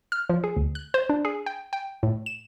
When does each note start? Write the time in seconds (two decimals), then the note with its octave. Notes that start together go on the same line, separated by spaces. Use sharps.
0.12 F6
0.29 F3
0.44 G#4
0.56 D2
0.75 F#6
0.94 C5
1.09 D4
1.25 G#4
1.46 G5
1.73 G5
2.03 A2
2.26 E7